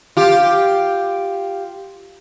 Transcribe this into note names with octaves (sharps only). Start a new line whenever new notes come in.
F4 G4